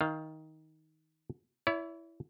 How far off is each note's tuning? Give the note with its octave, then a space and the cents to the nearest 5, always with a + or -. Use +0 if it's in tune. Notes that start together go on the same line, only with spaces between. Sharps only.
D#3 +15 F5 +0
E4 +5 C#5 +45